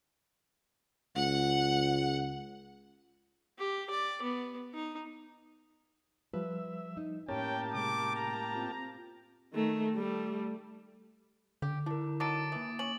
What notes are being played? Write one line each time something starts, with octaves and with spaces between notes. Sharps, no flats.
C#2 F#5
G4
D5
B3
D#4
F3 G3 B4 E5
D#4
A2 A#3 C#4 G4 C#5 G5 A5
C3 G#3 D6
A#5
C4 F4
D#3 A3
G3 A3
D3 G4
D4 E4 A#4
F#3 D#4 A4 D6 A6 D7
E3 A#3 D#6
C#4 F#7